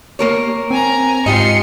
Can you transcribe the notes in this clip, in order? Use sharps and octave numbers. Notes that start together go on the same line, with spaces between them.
A#3 A#4 C#5
C4 G#5 A#5
G#2 F4 G4 D#5 C6 C#7